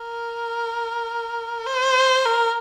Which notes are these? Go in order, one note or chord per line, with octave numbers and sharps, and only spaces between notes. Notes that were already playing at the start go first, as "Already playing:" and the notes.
Already playing: A#4
C5
A#4